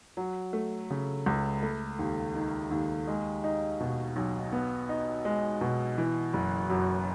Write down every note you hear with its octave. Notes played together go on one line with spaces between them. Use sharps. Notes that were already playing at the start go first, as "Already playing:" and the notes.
F#3
A3
C#3
C#2
A3
D#2
D#3
D#2
G#3
D#4
B2
B1
B3
D#4
G#3
B2
E3
F#1
F#2